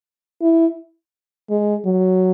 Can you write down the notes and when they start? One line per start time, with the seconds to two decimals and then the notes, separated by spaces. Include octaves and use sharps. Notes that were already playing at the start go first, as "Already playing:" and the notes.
0.42 E4
1.50 G#3
1.85 F#3